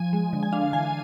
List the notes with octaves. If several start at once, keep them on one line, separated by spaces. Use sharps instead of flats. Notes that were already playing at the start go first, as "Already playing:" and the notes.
Already playing: F3 G#5
G#3
D3
G#5
D4 F5
E3 G#5